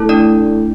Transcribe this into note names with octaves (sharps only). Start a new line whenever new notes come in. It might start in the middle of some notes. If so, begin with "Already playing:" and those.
Already playing: A3 E4 A4
D4 D5